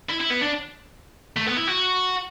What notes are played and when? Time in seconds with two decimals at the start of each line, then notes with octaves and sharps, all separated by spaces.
0.09 E4
0.20 E4
0.30 B3
0.41 D4
1.36 A3
1.46 B3
1.56 E4
1.67 F#4